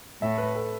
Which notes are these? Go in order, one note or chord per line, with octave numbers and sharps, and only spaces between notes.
A2 E5
B4
A4